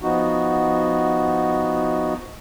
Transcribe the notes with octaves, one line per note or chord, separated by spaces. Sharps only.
F3 B3 D#4 F#4